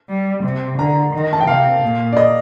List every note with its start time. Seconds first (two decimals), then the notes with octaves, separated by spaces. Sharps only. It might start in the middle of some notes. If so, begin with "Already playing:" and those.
0.10 G3
0.44 C3
0.78 D3 A#5
1.13 D#3
1.33 A5
1.40 G5
1.47 C3 F5
1.83 A#2
2.13 D5
2.17 D#5